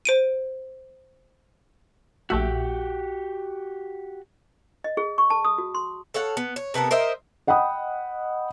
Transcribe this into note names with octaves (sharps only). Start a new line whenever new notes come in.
C5 D7 D#7
A#1 A3 F#4 G4 E5
D#5
G#4
C#6
A5
D#6
F#4
C6
A4 C#5 F5 F#5
B3
C#5
C3 B3 A4 A#4
A#4 C5 D#5 E5
D#5 F#5 G5 B5 D#6